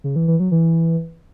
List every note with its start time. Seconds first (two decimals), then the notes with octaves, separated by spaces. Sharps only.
0.04 C#3
0.16 E3
0.28 E3
0.40 F#3
0.51 E3